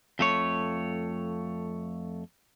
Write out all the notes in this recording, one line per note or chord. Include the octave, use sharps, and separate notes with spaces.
F2 A3 C#5